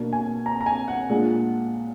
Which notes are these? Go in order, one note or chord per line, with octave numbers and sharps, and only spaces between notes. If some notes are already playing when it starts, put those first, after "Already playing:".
Already playing: B2 A#3 D4
G#5
A#5
A#5
G#5
F#5
A#2 G#3 D4